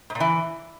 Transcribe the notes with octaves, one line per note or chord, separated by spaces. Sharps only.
G#2
A#2
E3